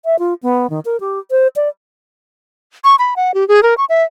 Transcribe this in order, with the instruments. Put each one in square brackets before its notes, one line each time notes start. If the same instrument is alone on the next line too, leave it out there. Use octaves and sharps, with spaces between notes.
[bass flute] E5
F4
B3
D#3
A#4
G4
C5
D5
[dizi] C#6
B5
F#5
G4
G#4
A#4
C#6
E5